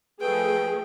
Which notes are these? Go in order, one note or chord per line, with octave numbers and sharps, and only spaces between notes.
F3 A3 G#4 B4 G5